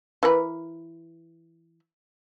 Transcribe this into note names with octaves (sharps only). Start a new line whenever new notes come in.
E3 A#4 B4